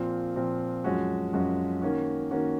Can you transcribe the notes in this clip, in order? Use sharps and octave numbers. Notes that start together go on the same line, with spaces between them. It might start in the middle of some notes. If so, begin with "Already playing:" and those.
Already playing: A#2 F3 C4
A#2 F3 C4
F#2 F3 G#3 C#4 F#4
F#2 F3 G#3 C#4 F#4
D#3 A#3 C#4 F#4
D#3 A#3 C#4 F#4